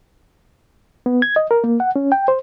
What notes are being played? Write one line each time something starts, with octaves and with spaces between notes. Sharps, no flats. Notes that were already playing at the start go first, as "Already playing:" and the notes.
B3
G#6
D#5
A#4
A#3
F#5
C#4
G5
C5